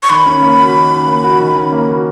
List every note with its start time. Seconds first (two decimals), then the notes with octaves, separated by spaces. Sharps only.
0.03 C#6
0.10 D#3 B5
0.26 C#4
0.42 A#3
0.59 F#4
0.75 D#3
0.91 C#4
1.07 A#3
1.24 F#4
1.40 D#3
1.56 C#4
1.72 A#3
1.88 F#4